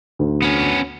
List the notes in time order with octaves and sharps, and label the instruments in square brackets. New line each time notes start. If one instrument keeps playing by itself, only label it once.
[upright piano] D2
[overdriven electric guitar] B3 C#4